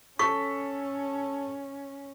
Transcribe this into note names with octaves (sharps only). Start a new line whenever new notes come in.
C#4 A4 C#6 B6